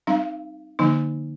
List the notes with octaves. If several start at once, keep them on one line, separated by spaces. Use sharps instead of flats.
G3 C4 D#4 F5
D3 F3 A#3 D#4